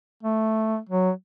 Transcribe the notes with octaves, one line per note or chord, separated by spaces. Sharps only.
A3
F#3